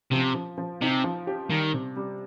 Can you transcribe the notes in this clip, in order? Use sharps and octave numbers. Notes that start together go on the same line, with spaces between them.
C3 F3
F3
F3
C3 D#4
F3
G4
D#3 G3
C3
G3